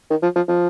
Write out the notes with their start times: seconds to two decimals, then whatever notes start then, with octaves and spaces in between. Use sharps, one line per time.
0.10 D#3
0.23 F3
0.36 F3
0.48 F3